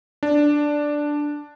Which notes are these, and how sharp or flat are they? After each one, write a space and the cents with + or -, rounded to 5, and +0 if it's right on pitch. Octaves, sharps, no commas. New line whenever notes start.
D4 +0